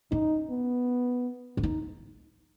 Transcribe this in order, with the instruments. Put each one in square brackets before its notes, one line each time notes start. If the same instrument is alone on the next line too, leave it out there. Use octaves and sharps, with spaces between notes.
[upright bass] C#4 [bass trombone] D#4
[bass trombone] B3
[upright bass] C#4
D#4